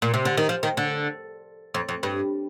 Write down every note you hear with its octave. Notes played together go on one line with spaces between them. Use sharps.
A#2
C3
D3
D#3
F3
D#3
D3
F2
F2
G2